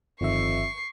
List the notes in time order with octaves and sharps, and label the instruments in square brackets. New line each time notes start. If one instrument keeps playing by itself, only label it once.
[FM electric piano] G1 D#3 E5 [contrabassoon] F2 [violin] C#6 C7